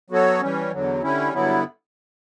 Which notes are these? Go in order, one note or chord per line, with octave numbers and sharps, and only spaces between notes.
F#3 B3 F#4 A4 C#5
E3 G3 C#4
E2 D3 F#3
D3 G3 C#4 E4
G2 D3 F#3 B3 E4